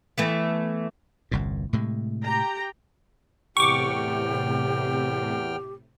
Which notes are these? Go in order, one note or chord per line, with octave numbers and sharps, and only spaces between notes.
E3 A3 B3
G1 C2 A#2
A2 C3 G#3
G4 G5 A#5
E2 A2 C3 G4 G5 C#6 D6 F6